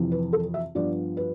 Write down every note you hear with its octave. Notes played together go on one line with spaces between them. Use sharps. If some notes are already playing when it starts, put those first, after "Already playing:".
Already playing: F2 C3 E3
B4
A4
E5
G2 F3 B3 D5
B4